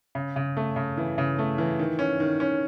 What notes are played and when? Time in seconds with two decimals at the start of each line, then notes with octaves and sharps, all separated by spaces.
0.15 C#3
0.36 C#3
0.57 A3
0.76 C#3
0.97 E3
1.18 C#3
1.39 A3
1.58 E3
1.79 D#3
1.99 C#4
2.20 D#3
2.40 C#4